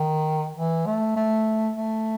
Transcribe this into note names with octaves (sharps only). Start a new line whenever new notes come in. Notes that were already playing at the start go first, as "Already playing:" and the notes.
Already playing: D#3
E3
A3
A3
A3